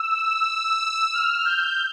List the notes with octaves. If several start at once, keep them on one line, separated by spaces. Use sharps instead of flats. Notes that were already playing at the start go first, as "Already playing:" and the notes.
Already playing: E6
F6
G6